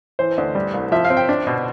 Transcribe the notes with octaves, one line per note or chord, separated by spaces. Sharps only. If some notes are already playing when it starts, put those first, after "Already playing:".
E3 C5
D2
G3
C2
F3 E5
F5
C4
G5
D4
B2